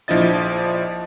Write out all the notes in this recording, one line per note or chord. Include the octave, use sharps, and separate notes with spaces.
A#1 F3 D4 E4 D#5 A6